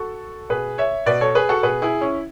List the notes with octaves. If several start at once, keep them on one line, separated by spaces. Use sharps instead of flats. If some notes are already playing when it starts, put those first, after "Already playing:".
Already playing: F#4 A4
B2 G#4 B4
C#5 E5
B2 B4 D5
A4 C#5
G#4 B4
F#4 A4
B2 G#4 B4
E4 G#4
C#4 E4